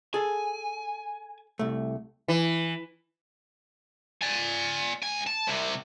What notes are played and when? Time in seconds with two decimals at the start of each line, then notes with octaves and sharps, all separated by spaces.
0.14 G#4 A4 G#5
1.59 C2 A3
2.28 E3
4.22 D5 G#5
5.03 C#2 G#5
5.27 A5
5.47 C2 C3